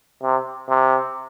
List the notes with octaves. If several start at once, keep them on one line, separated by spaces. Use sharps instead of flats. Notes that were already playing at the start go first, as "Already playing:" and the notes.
C3
C3